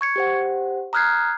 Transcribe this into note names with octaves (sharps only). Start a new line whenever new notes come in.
C#6 G#6 C#7
G4 C5 F#5
A#5 D#6 F6 F#6 G#6 C7